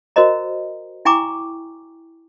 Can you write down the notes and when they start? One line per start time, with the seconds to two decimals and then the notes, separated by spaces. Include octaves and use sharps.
0.16 F#4 A#4 C5 D#5 A#5
1.05 E4 G5 G#5 A#5 C#6 D6